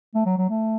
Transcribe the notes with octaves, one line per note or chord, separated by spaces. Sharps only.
A3
F#3
F#3
A3